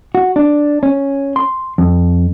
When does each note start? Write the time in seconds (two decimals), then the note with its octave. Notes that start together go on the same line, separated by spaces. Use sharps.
0.15 F#4
0.36 D4
0.83 C#4
1.36 C6
1.78 F2